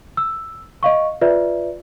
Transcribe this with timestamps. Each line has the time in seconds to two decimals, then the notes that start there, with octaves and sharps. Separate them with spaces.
0.17 E6
0.83 D#5 F5 C#6
1.21 F4 B4 D5 E5